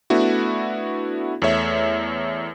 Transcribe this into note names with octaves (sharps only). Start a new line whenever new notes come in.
A3 B3 D4 E4 F#4
E2 A3 C#5 E5